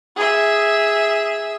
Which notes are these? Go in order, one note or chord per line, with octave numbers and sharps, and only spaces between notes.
G#4 E5